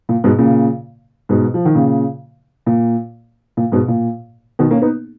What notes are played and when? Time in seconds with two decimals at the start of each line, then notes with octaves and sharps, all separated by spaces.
0.09 A#2
0.24 G#2 B2
0.38 A#2 C#3
1.29 G#2 B2
1.54 F3
1.65 D#3
1.75 A#2 C#3
2.66 A#2
3.57 A#2
3.72 G#2 B2
3.88 A#2
4.59 B2 D#3
4.71 A#3 C#4
4.82 B3 D#4